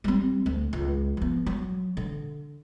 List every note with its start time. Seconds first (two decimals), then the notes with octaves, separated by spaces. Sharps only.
0.04 G3 C4
0.46 D2
0.73 C#2
1.17 F3 B3
1.46 F#3
1.97 D3